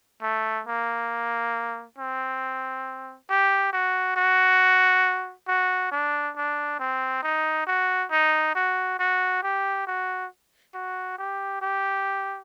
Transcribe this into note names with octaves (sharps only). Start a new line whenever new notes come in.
A3
A#3
C4
G4
F#4
F#4
F#4
D4
D4
C4
D#4
F#4
D#4
F#4
F#4
G4
F#4
F#4
G4
G4